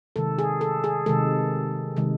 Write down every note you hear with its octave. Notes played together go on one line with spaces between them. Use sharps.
C3 D#3 G#3 A4
G#4
A4
G#4
C3 D#3 G#3 A4
C3 D#3 G#3